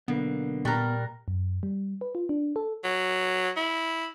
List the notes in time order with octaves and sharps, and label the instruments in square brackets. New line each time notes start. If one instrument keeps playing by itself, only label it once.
[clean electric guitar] B1 D3 A#3 [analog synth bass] B3
[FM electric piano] A#2 F#6 A#6 [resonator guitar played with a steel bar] G3 A#4
[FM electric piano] F#2
G3
B4
F4
D4
A4
[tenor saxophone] F#3
E4